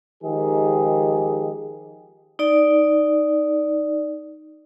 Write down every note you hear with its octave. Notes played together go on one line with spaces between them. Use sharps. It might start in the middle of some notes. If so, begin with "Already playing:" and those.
D#3 F3 G#3 G4 G#4
D#4 D5